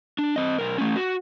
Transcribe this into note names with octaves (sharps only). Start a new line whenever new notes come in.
D4
C4 D#5
B1 A#4
A3 C#4
F#4